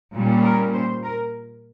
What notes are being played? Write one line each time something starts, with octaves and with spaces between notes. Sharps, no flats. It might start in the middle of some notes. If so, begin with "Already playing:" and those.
A#2 G3 C#4
A#4
C5
A#4